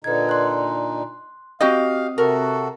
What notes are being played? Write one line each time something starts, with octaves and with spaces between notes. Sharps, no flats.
A#2 D3 D#4 B4 G#6
C6 F#6
C4 F#4 G4 D#5 F5 D#6
C3 F#4 A4 A#4